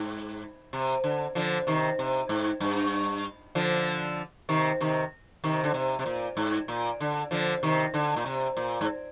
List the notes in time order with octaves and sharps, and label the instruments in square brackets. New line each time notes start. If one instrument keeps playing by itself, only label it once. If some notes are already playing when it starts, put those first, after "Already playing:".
Already playing: [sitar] G#2
C3
D3
D3 F3
C3 D#3
C3
G#2
G2
D3 F3
C3 D#3
C3 D#3
C3 D#3
D3
C3
C3
A#2
G#2
A#2
D3
D3 F3
C3 D#3
D3
A#2
C3
A#2
G#2